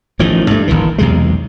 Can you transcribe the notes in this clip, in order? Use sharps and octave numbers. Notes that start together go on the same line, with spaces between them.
A1 A2 D#3 F3
G2 A3
F#1 C#2 D#3 E3
B1 E2 C3 G#3